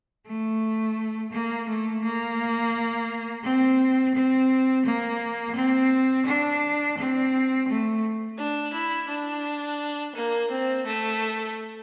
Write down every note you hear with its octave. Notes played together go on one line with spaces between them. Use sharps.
A3
A#3
A3
A#3
C4
C4
A#3
C4
D4
C4
A3
D4
E4
D4
A#3
C4
A3